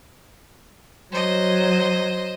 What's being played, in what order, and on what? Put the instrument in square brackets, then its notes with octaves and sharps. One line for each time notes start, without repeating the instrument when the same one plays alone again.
[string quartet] F#3 [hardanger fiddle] C5 D#5